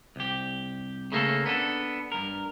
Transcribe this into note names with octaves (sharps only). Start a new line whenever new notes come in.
C2 G4
C#3 A3 A#3 G4 A4
B3 D4 A4
G2 A#4